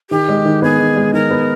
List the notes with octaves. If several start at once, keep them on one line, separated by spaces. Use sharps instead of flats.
D#3 G4
G#3
D#3
B3 G#4
D#3
G#3
D#3 A#4
B3